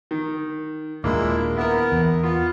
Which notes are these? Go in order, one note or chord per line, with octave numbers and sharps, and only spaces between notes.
D#3
D#1 A#2 G#3 A#3 D4 E4
B3 E4 A#4
E2
B3 F4